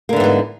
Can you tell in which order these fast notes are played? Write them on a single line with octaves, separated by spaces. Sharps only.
A#3 D3 E3 G#2 B3